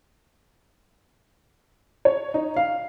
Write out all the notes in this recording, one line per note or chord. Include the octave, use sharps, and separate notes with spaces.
C#5
D#4
F5